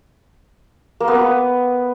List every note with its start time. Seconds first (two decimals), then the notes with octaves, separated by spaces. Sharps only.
1.00 A#3
1.08 B3
1.15 B4